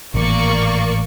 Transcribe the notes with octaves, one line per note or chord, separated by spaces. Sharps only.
G#1 A2 E3 A#3 D5 C#6